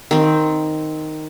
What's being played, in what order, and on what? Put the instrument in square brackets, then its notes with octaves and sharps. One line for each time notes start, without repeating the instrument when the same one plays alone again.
[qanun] D#3 C4